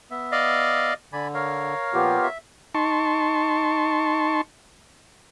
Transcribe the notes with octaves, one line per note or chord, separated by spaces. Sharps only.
B3 E5
D5 D#5 F5
D3 D5 G#5 B5
A#4 C#5 F5
A#2 F3 B3 F4 G4
E5
D#4 A5 C6 C#6